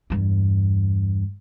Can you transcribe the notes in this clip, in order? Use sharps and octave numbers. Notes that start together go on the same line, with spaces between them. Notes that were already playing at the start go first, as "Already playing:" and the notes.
E2 G2